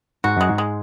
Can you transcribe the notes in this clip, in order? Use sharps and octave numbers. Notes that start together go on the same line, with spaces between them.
G#2 F#4
F#2 G#3
G#2
G#3